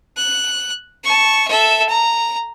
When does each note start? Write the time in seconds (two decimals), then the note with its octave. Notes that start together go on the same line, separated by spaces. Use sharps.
0.17 F#6
1.04 A5 C#6
1.47 A4 E5
1.89 A#5